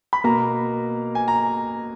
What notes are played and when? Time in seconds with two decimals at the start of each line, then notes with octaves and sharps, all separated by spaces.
0.13 B5
0.24 B2 A#3 A#5
1.15 G#5
1.28 A#5